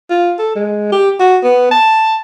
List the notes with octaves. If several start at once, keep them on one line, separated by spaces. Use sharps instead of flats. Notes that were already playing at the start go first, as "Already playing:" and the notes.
F4
A4
G#3
G4
F#4
B3
A5